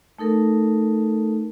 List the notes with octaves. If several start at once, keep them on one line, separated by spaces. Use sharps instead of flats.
A3 D#4 A4 A#4